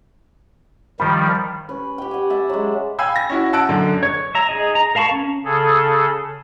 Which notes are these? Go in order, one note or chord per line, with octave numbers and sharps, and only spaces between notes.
D#3 F3 G3 B5
C#4 B4
G4 G5
F#5 G#5
D5 E5 F#5
F#3 G#3
F5 G5 G#5 B5 E6 G#6
A#6
C#4 E4 F#4
F#5 A5 E6 F#6 D7
F#2 D3
C#5
E5 A#5
D#4 G#4 D#5
A#5
A#4 F5 A5 B5 C#6
C#4
C#3 G#4 A4